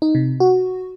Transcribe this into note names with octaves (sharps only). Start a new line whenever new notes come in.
D#4
C3
F#4